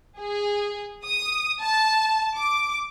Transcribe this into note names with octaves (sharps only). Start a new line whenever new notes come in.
G#4
D#6
A5
D6